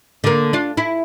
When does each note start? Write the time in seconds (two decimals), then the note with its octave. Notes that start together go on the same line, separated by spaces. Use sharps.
0.24 D3 A#3
0.53 D4 F4
0.77 E4